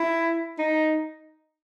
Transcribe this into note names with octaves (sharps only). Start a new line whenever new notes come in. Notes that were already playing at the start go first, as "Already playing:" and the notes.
Already playing: E4
D#4